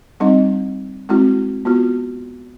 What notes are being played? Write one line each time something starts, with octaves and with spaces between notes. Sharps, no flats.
G3 C4 D4 D#4 D#5
G#3 C4 E4 F#4
B3 F4 F#4